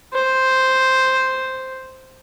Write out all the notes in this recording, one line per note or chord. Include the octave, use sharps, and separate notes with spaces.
C5